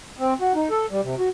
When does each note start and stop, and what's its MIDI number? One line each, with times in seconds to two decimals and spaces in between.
0.19 0.34 60
0.41 0.53 66
0.55 0.69 63
0.71 0.86 69
0.90 1.01 55
1.04 1.15 48
1.19 1.29 66